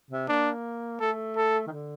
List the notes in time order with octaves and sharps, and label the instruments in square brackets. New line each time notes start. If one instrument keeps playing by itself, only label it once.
[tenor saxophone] C3
[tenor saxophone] A#3 [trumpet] D4
[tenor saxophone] A3 [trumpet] A4
[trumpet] A4
[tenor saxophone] D#3
D3